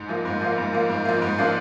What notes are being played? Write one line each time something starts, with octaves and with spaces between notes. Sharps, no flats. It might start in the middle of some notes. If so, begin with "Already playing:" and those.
Already playing: G#2
F3 A#3
G#2
F3 A#3
G#2
F3 A#3
G#2
F3 A#3
G#2
F3 A#3 D4 F4